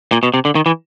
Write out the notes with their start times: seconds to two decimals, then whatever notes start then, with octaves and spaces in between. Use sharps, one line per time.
0.12 A#2
0.23 B2
0.34 C3
0.45 D3
0.55 D#3
0.66 E3